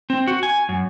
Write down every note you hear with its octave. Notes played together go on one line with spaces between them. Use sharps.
C4
F#4
G#5
F#2